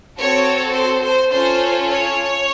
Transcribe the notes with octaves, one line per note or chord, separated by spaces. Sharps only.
C4 F#4 A4 C#5
C5
C5
C#4 F4 A4 C5
C#5